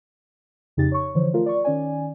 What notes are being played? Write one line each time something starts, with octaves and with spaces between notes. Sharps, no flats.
F2 C#3 D#4 G4 A6
C#5 C#6
D3 E3 F3 C5 C#5
A3 F4 A#4
D5 C#6
D#3 C#4 D5 G#5